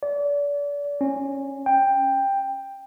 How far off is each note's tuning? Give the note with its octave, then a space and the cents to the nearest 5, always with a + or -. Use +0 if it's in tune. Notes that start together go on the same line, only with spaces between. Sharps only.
D5 -35
C#4 -15
G5 +10